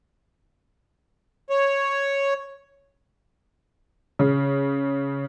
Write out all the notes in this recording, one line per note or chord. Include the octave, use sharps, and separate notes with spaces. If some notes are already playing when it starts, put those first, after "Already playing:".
C#5
C#3